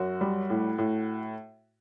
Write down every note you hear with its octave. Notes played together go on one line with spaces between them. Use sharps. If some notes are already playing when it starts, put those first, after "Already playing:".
Already playing: F#2 F#4
G3
A2
A2